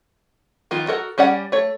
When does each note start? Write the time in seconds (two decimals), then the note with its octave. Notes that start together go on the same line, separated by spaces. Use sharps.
0.71 D#3 B3 F4
0.88 F#4 A4 A#4 F#5
1.18 G3 C#4 D5 F#5
1.52 A3 C#5